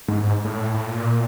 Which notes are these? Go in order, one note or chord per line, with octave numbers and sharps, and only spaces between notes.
G#2
G#2
A2
A2
A#2